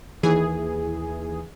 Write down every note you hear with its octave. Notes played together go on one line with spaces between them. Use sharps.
D#2 E3 G#4